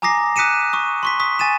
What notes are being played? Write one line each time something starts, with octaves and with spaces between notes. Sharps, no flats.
G#5 A#5 D6 D#6 A#6 C7
D#6 F#6 B6 C#7 D#7 E7
C#6 D#6
C6 C#6 B6
C#6 D#6 B6
G#5 A6 D#7 E7